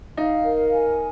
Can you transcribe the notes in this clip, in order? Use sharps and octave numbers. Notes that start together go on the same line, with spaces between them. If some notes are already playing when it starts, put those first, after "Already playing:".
D#4 F5
A#4
G#5